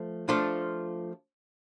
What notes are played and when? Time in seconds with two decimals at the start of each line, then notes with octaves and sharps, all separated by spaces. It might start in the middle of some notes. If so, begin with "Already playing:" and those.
Already playing: F3 A3
0.29 F3 A3 D4 F4